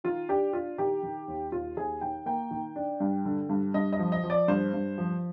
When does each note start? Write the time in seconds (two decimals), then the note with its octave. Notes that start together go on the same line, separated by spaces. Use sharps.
0.04 D#3 F4
0.29 D4 G4
0.53 D4 F4
0.78 D#3 G4
1.03 D#3
1.28 D#2
1.52 D#2 F4
1.77 D#2 G#4
2.01 D#3 G5
2.26 A#3 G5
2.51 D#3
2.76 D4
3.00 G2
3.25 D3
3.49 G2
3.74 G2 D#5
3.93 D#5
3.99 F3
4.12 D#5
4.24 F3
4.30 D5
4.48 G2 C5
4.74 G2
4.98 F3